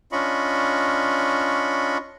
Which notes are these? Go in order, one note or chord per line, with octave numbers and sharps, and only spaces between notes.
C#4 D4 F4 D#5 B5 C#6